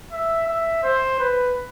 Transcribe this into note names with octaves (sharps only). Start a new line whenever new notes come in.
E5
E5
C5
B4